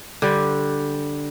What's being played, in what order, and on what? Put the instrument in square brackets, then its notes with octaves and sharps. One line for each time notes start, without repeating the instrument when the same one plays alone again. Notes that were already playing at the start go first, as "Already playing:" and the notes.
[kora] D3 G3